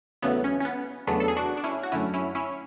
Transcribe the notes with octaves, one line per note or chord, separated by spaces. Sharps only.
E2 C#3 F#3 A3 B3
C#4
C#4
B3
E2 C#3 F#3 A3 B3 D4
A4
G#4
D4 F#4
D4
C#4 E4
F#4
F#2 D3 F#3 A3 C#4 E4
C#4 E4
C#4 E4